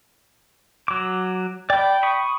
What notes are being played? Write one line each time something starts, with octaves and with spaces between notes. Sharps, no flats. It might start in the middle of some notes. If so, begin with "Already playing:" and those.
F#3 D6
D5 G5 B5
B5 C#6 D#6